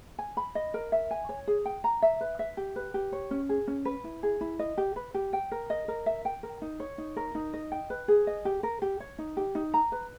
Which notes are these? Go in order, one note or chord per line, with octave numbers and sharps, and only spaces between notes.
G#5
B5
D#5
A#4
E5
G#5
C#5
G#4
G5
A#5
E5
B4
E5
G4
B4
G4
C#5
C#4
G#4
C#4
B4
E4
G#4
E4
D#5
G4
B4
G4
G5
A#4
D#5
A#4
E5
G5
A#4
D#4
C#5
D#4
A#4
D#4
D#5
G5
B4
G#4
D#5
G4
A#4
G4
C#5
D#4
G4
D#4
A#5
B4